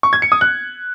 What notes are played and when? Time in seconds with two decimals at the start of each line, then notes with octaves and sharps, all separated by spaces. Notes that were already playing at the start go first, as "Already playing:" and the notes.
0.03 C#6
0.13 G#6
0.22 C#7
0.32 D#6
0.41 F#6